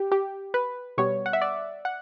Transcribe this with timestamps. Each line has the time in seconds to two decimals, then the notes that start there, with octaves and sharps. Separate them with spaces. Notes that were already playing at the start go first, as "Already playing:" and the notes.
Already playing: G4
0.12 G4
0.54 B4
0.98 B2 G3 B3 C#5
1.26 F#5
1.33 E5
1.42 D5
1.85 F#5